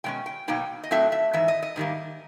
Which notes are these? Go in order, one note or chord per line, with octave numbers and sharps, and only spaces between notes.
B2 G#3 C#4 G5
G5
B2 F#3 A#3 D#4 G5
D#5
A2 F#3 A3 C4 E5
E5
G#2 E3 E5
D#5
D#5
G#2 D#3 G3 A#3